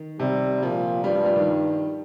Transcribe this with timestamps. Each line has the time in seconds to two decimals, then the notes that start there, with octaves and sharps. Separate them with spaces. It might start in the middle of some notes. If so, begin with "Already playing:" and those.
Already playing: D#3
0.20 C3 G3
0.62 A#2 F3
1.04 G2 G3
1.15 F3
1.26 G3
1.36 D#3